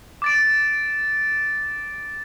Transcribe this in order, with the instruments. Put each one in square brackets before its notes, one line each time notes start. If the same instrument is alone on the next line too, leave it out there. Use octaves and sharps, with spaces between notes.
[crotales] D6 A6 D7